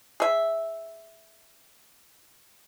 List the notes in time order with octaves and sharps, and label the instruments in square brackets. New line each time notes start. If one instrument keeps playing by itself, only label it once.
[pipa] G#4 E5